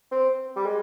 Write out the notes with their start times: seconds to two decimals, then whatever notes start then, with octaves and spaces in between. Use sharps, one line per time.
0.11 C4
0.56 G3
0.65 G#3